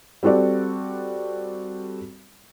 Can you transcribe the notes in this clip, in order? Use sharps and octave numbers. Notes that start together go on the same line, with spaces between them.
G3 C4 F#4 A4 D5